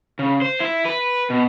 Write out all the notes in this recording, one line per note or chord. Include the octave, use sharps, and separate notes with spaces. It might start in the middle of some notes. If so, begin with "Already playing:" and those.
C#3
C5
E4
B4
B2